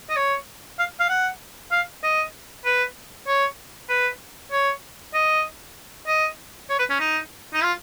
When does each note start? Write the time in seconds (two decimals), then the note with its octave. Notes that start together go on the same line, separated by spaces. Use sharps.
0.10 D#5
0.16 C#5
0.79 F5
1.00 F5
1.09 F#5
1.71 F5
2.03 D#5
2.65 B4
3.27 C#5
3.89 B4
4.52 C#5
5.14 D#5
6.07 D#5
6.70 C#5
6.79 B4
6.90 C#4
7.00 D#4
7.54 D#4
7.63 F4